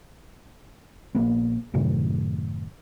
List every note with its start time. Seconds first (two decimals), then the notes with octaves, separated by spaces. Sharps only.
1.15 A#1 A#3 B3
1.74 F#2 A2 C3 D#3